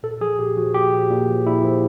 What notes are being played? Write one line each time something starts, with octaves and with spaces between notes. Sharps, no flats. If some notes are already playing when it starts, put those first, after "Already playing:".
A#2 A4
F3 G#4
A#2 G4
F3 F#4
A#2 G4
F3
A#2
F3
A#2 E4
F3